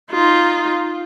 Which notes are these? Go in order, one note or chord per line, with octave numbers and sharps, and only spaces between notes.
D#4 F4